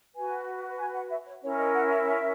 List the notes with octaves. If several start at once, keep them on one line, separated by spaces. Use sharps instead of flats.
F#4 B4 G#5
G#5
F#5
E5
C#5
C#4 E4 A#4 C#5
D#5
F#5
E5